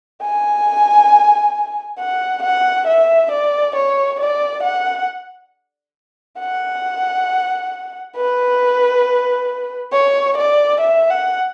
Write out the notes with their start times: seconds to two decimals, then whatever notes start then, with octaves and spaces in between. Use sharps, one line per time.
0.22 G#5
1.99 F#5
2.43 F#5
2.87 E5
3.32 D5
3.75 C#5
4.20 D5
4.63 F#5
6.40 F#5
8.16 B4
9.93 C#5
10.37 D5
10.81 E5
11.11 F#5